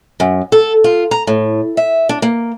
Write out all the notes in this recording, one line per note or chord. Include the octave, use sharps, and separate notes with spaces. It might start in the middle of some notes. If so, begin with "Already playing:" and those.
F#2
A4
F4
A#5
A2
E5
D4
A#3